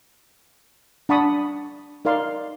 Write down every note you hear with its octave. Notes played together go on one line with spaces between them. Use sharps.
D4 F#5 A5 B5 C#6 D#6
D#4 A#4 D5 F5 C6